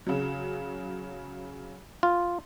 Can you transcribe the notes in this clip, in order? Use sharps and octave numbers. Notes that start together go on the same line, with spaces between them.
C#3 F#3
F4